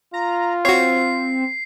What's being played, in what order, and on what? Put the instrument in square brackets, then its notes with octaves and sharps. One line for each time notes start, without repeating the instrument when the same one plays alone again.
[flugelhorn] F4 [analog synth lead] A#5
[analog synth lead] C4 [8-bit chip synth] F#4 C#5 [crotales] C7